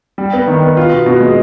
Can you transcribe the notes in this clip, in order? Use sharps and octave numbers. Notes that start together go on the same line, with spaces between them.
G3
B3
D#3
B3
F4
B2
B2
G#3